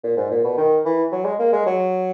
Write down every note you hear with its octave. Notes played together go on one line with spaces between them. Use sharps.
A#2
G#2
A#2
B2
D#3
E3
F#3
G#3
A#3
G#3
F#3